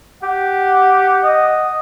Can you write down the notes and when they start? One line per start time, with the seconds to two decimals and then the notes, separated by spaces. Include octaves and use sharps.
0.23 G4 F#5
1.23 D#5